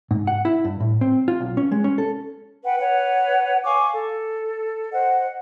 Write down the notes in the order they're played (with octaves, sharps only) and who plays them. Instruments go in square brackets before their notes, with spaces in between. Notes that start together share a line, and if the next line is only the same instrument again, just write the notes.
[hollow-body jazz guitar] G#2
F#5
E4
G2
A2
C4
F4
B1
C#4
G#3
C#4
A4
[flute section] B4 F#5 G5
B4 C#5 F#5
F5 G#5 C#6 D6
A4
C5 D#5 F#5